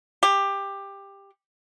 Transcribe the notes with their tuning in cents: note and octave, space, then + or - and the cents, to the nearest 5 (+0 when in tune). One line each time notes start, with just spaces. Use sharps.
G4 +15